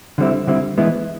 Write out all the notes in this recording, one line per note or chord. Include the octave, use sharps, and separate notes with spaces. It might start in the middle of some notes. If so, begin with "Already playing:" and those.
D3 G3 C4 E4
D3 G3 C4 E4
E3 G#3 B3 E4